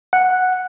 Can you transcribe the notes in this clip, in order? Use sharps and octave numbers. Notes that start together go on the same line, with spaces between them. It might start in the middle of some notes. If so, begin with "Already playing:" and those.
F#5